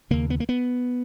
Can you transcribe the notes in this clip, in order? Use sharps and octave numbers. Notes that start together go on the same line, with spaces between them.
D#2 C#3 A#3
B3
A#3
B3